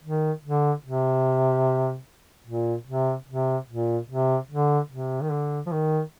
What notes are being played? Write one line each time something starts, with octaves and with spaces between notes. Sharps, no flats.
D#3
D3
C3
A#2
C3
C3
A#2
C3
D3
C3
D#3
D3
F3
D#3